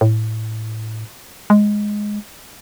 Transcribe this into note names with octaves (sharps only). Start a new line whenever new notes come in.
A2
G#3